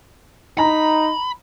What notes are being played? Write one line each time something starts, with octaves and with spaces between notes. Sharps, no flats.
D#4 A#5 B5